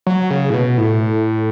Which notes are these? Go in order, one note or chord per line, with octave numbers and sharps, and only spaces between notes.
F#3
C#3
A2
B2
A2